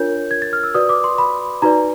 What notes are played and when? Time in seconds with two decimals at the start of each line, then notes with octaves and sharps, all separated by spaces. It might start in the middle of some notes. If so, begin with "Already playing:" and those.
Already playing: D4 F4 A#4 C#5 G6
0.31 G#6
0.42 A6
0.53 F6
0.64 E6
0.74 F#4 B4 D5 D#6
0.89 D6
1.04 C6
1.18 B5
1.62 D#4 F#4 B4 D5 A#5